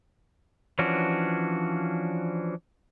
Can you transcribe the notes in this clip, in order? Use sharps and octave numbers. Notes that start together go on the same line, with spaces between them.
E3 F3 C#4 D4 F#4